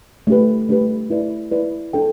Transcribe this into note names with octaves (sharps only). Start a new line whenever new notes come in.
A3 D4 G4 B4
A3 D4 G4 B4
E4 B4 D5
E4 B4 D5
D4 A4 G5